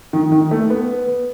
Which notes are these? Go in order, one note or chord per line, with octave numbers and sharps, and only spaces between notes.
D#3
D#3
A3
B3